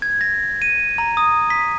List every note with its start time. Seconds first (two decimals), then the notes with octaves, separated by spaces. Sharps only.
0.02 G#6
0.21 A#6
0.62 D#7
0.98 A#5
1.17 D#6
1.50 B6